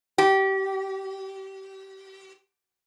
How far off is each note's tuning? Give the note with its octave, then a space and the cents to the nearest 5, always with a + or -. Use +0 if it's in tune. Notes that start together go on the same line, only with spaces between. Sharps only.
G4 -25